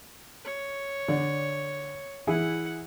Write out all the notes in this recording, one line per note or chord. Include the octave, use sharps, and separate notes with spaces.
C#5
D3 D5
E3 E4 G#4 F#5